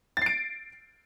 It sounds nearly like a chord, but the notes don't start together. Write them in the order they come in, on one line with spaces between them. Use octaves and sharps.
A6 C7 D7